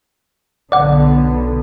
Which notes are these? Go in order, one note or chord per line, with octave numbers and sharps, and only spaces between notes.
B1 D3 B3 D5 F#5